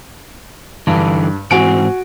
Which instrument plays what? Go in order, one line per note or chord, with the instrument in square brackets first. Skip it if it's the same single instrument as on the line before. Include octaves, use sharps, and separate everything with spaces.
[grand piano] G2 [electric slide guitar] D3 E3
[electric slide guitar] G#2 E3 C4 [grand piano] F#4 G#5 D7